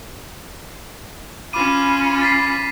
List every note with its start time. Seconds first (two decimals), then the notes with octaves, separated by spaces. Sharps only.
1.53 C#4 F4 B5 D6 D#7
2.21 A6 B6 C7